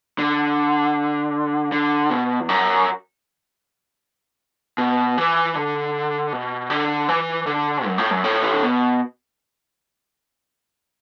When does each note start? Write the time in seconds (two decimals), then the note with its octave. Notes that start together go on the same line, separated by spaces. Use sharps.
0.19 D3
1.72 D3
2.10 B2
2.40 E2
2.49 F#2
4.78 B2
5.18 E3
5.55 D3
6.33 B2
6.70 D3
7.09 E3
7.46 D3
7.86 F#2
7.98 A2
8.11 F#2
8.24 A2
8.43 E3
8.52 D3
8.62 B2